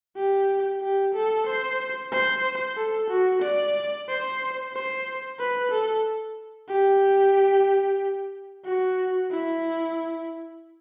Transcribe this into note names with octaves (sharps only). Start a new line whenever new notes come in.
G4
G4
A4
C5
C5
A4
F#4
D5
C5
C5
B4
A4
G4
F#4
E4